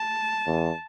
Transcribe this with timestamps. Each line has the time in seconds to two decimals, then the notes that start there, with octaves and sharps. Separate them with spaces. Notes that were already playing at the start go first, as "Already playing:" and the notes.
Already playing: A5
0.47 E2